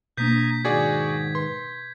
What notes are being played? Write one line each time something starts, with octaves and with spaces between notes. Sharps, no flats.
B2 A#3 D4 A#5 D#6 G6 G#6 B6
G#2 D#3 F#4 G#4 D5 G#6
B4 C6